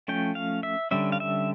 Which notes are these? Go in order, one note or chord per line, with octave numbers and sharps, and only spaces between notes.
F3 A3 C#4 G5
F5
E5
D3 G3 C#4 E5
F5
E5